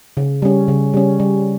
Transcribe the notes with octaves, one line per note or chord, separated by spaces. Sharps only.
C#3
G3 C#4
C#3
G3 C#4
G3